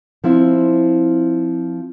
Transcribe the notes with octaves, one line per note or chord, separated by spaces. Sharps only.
F3 C4 E4